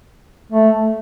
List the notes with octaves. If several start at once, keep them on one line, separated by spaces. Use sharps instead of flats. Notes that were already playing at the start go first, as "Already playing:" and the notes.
A3